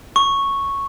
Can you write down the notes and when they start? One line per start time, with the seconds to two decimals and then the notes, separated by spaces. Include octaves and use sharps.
0.16 C#6